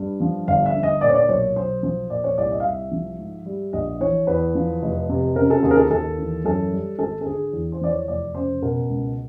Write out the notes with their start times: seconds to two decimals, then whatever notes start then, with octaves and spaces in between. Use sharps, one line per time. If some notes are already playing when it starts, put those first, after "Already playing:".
Already playing: G2
0.20 F3
0.48 G1 F5
0.66 E5
0.75 D3
0.83 D#5
1.01 A#2 D5
1.09 C#5
1.15 D5
1.29 B1 C#5
1.56 B1 C5
1.83 F3 C5
2.10 A#2 D5
2.24 C#5
2.38 C2 D5
2.51 D#5
2.60 F5
2.64 C2 E5
2.91 F3
3.19 G#2
3.46 G3
3.73 A#1 D#5
4.00 E3 C#5
4.27 E2 B4
4.55 F3
4.82 F1
5.09 C3
5.36 C#3 A#4
5.50 A4
5.63 D#2 G#4
5.71 A#4
5.77 A4
5.90 D#2 A4
6.18 E3
6.45 F#2 A4
6.72 G3
6.99 G#1 A4
7.21 A4
7.26 D3 G#4
7.53 E2
7.72 C5
7.81 F3 D5
7.90 C#5
8.07 F1 D5
8.35 C#3 C5
8.62 B2 A#4
8.90 C#2